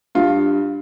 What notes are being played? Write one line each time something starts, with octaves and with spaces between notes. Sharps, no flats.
G2 F4